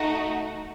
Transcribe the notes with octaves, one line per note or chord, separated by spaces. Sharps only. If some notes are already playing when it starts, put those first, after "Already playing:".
Already playing: A3 D#4 F#4